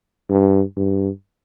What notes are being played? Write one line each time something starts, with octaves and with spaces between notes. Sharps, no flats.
G2
G2